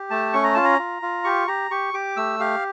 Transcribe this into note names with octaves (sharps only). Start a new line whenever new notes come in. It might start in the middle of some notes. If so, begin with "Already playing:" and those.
Already playing: G4
A3 A5
C#4 C#6
A#5
F4 A5
A#5
F4
F4
G4 C#6
G4 A#5
G4 C#6
G4 D6
A3 E6
G4 F5